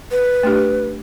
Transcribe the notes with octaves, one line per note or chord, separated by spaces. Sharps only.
B4
A3 D4 G4